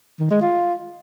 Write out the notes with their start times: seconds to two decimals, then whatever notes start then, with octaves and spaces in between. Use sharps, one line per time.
0.20 D#3
0.31 G#3
0.41 F4